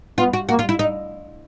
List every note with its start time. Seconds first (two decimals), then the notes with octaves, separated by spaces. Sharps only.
0.18 B3 F4
0.33 F#4
0.49 A#3 F#4
0.59 F4
0.69 E4
0.79 D#4